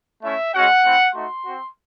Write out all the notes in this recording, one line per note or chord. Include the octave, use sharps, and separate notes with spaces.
A3 C#4 E4 E5
G#3 C#4 F#4 F#5
A3 C4 E4
A3 D#4 F#4 C6
C4 F#4